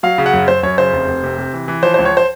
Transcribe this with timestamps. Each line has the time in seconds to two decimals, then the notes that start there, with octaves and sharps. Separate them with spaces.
0.03 F#3 F5
0.18 C#3
0.26 F#5
0.33 F#2
0.48 F#2 C5
0.63 F#2 C#5
0.78 C#3 C5
0.93 F1
1.08 F1
1.23 C3
1.38 C3
1.53 E3
1.68 E3
1.83 F3 C5
1.94 C5
1.98 C#2
2.05 C#5
2.17 C5